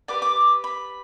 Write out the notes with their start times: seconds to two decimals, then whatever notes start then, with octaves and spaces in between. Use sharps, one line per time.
0.08 G4 B4 D5 D6
0.22 D6
0.64 B5